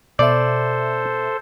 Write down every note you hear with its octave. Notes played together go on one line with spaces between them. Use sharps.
B2 A4 C5 D5 E5